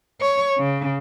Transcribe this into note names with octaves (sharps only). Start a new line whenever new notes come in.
C#5
C#3